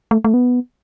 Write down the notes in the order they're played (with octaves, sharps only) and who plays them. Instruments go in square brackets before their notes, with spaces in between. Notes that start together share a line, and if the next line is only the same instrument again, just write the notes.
[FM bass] A3
A3
B3